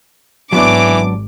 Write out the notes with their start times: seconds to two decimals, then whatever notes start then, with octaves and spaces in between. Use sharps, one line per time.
0.53 G#1 G#2 E3 F#3 B3 D4 D6